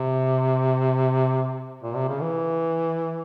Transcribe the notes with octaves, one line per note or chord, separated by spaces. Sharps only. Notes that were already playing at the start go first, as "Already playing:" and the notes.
Already playing: C3
A#2
C3
C#3
E3